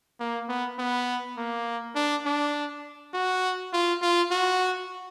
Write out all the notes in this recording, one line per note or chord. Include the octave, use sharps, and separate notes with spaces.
A#3
B3
B3
A#3
D4
D4
F#4
F4
F4
F#4